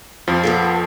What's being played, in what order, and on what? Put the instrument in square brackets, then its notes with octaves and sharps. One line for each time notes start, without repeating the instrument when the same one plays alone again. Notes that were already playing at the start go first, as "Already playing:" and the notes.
[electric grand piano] F2 F3
[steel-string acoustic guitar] B3 F4 A4